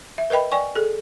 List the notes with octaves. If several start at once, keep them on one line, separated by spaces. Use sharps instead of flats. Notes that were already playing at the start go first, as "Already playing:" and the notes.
E5
A#4 B4 D#5 G5 B5
D5 G5 G#5 C#6
G#4 A4